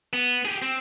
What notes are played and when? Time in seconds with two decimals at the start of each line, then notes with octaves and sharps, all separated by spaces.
0.13 B3
0.45 G4 G#4
0.62 C4